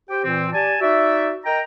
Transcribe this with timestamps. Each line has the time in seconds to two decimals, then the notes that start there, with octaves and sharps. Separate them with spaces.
0.09 G4 C5 G5
0.25 A#2 E3 C4
0.53 G4 D5 G#5 A5
0.81 D#4 F#4 D5 E5
1.46 A#4 D#5 G5 A#5